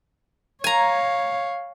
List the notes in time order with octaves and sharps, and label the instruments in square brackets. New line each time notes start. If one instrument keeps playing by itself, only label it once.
[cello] C#5 F5 [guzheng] G#5 A#5